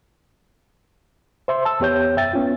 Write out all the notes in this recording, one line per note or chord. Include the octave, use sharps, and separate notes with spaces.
C5 E5 C6
A5 E6
E2 B3 G4 C#5 G6
F#2 E5 G5 A6
B3 C#4 F4